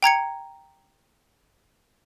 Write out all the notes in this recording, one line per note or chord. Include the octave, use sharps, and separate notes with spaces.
G5 A#5 G#6 C#7